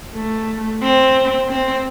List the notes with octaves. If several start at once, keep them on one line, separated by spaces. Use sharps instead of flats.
A3
C4
C4